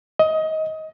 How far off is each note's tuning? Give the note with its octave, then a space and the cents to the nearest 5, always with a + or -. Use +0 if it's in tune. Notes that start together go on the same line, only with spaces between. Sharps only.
D#5 +20